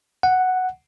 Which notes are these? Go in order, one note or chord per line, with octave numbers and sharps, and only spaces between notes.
F#5